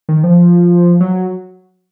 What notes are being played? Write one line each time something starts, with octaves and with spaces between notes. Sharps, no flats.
D#3
F3
F#3